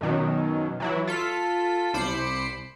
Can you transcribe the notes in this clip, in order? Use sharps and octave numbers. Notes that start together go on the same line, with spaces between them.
F#2 B2 D#3 F#3
E3 F#3 E4
F4 A4 B6
C2 C5 B5 D6 C7 C#7